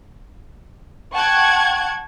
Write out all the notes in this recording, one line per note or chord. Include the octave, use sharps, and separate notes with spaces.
F#5 G5 A5 C#6 F#6 G#6